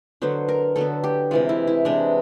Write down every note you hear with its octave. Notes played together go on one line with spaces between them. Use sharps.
D3 F#3 B3 C5
A#4
D3 F#3 B3 A4
G4
C3 E3 G#3 F4
E4
E4
C3 E3 G#3 D4